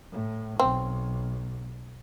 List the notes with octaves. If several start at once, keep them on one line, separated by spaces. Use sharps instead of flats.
A2
B1 C4